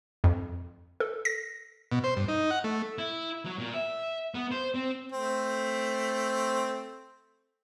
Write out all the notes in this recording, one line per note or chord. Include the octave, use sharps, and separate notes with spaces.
F2
A4
A#6
B2
C5
G2
D#4
F#5
A3
E4
F#3
A#2
E5
B3
C5
C4
A3 C4